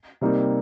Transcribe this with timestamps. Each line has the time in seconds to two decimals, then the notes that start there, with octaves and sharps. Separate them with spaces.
0.21 C3 G3 A#3 D#4